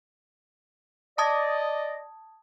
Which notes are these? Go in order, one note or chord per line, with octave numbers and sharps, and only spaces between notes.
D5 D#5 A5 D#6 G#6